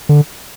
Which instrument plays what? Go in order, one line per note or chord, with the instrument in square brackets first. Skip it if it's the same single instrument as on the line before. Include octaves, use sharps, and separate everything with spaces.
[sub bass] D3